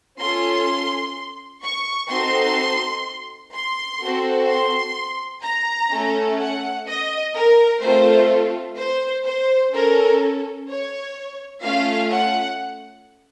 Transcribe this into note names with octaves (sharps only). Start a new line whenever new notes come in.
C#4 F4 A4 C6
C#6
C4 D#4 F#4 A4 C6
C6
C4 F#4 A4
C6
A#5
A3 C#4 A4
F#5
D#5
A#4
A3 C4 F4 A4 C5
C5
C5
C#4 A4 A#4
C#5
A3 C#4 F4 F5
F#5